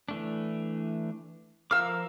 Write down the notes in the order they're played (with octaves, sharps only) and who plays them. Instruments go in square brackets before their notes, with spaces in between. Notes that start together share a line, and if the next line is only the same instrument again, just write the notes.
[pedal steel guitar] E3 A3 D4
[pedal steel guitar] F3 A#4 D6 [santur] F5 E6